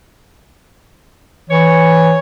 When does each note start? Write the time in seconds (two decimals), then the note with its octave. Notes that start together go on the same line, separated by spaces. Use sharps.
1.50 E3 C#5